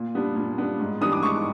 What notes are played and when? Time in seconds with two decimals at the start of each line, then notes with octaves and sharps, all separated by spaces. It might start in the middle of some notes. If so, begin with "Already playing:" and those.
Already playing: A#2
0.15 G3 B3 D4
0.35 A#2
0.58 G3 B3 D4
0.80 G#2
1.01 E3 G3 B3 D4 D#6
1.12 D6
1.23 G#2 C#6